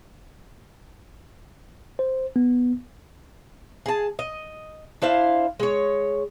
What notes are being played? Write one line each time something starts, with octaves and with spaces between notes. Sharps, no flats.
C5
B3
G#4 A5
D#5
D4 E4 C5 F5
G#3 C#5